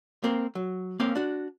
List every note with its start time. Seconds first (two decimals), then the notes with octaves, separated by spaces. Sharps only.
0.24 A#3 C4 A#4
0.55 F#3
1.00 A#3 C4 C#4 A#4 F5
1.15 D4 F#4